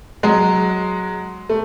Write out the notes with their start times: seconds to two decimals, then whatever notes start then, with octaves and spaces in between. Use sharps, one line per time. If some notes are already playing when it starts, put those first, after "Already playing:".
0.23 F#3 G#3
1.49 A3